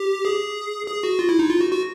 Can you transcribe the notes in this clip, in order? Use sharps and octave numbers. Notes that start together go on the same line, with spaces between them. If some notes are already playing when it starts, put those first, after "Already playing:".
Already playing: G4
G#4
G#4
F#4
F4
E4
D#4
F4
F#4
F#4